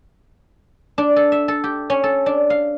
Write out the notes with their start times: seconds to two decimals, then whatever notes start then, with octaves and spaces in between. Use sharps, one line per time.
0.98 D4
1.16 A4
1.32 E5
1.48 A4
1.64 G4
1.90 C#4
2.04 A4
2.26 D4
2.50 F5